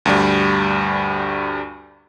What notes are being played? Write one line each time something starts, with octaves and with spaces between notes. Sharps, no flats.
D2 G2 G3